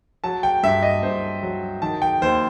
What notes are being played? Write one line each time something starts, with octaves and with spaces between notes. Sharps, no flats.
F#3 A5
G5
G2 E5
D#5
G2 C5
F#3
D#3 A5
G5
D#2 C5